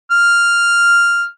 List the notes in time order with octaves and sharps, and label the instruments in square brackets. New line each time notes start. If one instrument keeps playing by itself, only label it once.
[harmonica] F6